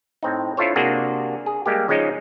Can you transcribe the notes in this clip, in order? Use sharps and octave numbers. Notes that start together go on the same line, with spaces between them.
A2 C4 D#4
D4 E4 F4 A4 C5 C#5
C3 A#3 D4 F#4 G#4
G#4
G3 G#3 A#3 G4
C#3 F3 G#3 C#4 D#4